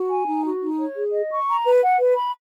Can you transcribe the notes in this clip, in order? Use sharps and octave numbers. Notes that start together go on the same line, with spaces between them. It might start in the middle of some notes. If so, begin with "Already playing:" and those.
Already playing: F#4
G#5
D#4
F#4
D#4
C#5
G#4
D#5
C#6
A#5
B4
F#5
B4
B5